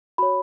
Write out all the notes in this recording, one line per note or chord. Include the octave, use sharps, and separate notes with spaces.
F#4 C#5 B5